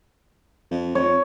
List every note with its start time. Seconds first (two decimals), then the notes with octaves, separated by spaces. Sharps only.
0.71 F2
0.95 F2 C#5